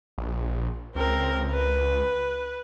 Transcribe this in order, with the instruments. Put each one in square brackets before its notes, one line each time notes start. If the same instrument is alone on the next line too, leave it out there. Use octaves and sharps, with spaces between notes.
[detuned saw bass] A#1
[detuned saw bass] C#2 [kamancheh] C4 A#4
[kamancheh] B4